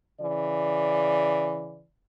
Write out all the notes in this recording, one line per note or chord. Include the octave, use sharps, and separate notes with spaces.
C#3 E3 D5